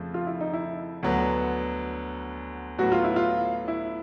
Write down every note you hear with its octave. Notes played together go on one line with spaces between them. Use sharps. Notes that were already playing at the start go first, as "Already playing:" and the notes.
Already playing: F2 C#3 F3 A3
F4
E4
D#4
E4
D2 D3 F#3 B3
A2 F#3 B3 F#4
F4
E4
F4
E4